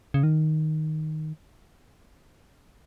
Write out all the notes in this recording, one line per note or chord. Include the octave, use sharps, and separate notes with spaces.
C#3
D#3